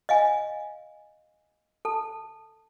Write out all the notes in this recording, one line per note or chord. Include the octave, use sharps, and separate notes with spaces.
D#5 F5 G#5
A4 A5